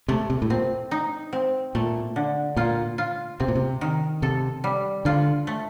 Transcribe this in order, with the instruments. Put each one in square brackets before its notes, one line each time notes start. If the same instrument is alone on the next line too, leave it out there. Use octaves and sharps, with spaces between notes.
[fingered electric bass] C3 [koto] A3
[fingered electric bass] C3
A2
[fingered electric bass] A#2 [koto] C4
[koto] D#4
C4
[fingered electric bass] A#2 [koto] A3
[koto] D3
[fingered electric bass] A#2 [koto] F4
[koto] F4
[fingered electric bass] C3 [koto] C4
[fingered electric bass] A#2
C3
[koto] D#3
[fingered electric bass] C3 [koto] A4
[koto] G3
[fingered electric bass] D3 [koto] F4
[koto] A3